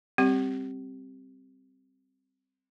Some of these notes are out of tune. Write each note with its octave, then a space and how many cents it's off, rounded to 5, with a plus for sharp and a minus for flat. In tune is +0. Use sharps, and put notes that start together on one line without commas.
G3 +0 C4 +0 G4 +0